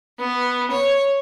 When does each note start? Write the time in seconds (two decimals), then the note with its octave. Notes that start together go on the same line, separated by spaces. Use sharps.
0.18 B3
0.70 C#5